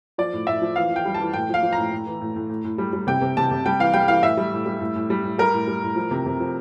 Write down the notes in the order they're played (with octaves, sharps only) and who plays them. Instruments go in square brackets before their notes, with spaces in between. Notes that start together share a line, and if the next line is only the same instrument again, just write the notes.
[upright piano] F3 D5
A2
A2 E5
F3
E3 F5
E3
G5
G3
A5
E3
A2 G5
F3
F5
F3
A#5
A2
A2
E3
A2
A2
A2
A2
G3
G3
C3 G5
C3
C3 A5
C3
G3 G5
E3 F5
G3 G5
E3 F5
A2 E5
G3
A2
G3
A2
A2
G3
A2
G3 A#4
A2
G3
A2
F3
C3
C3
F3